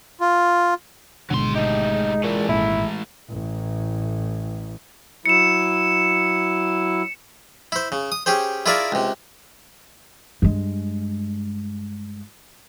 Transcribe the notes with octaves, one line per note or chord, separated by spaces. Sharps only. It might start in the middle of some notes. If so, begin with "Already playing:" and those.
F4
G#1 B2 D3 F#3 G#3 C6
A3 D#4 G4
A#2 E3 A3
G#1 A#2 E4
A1 A2
F#3 E4 C#7 E7
E4 C5
C#3
D#6
C#4 G4 G#4 C5
E4 F4 G#4 A#4 D5 E5
C#2 C3
G2 G#3